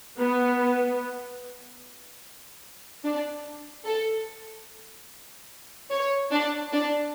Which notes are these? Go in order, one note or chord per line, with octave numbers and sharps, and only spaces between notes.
B3
D4
A4
C#5
D4
D4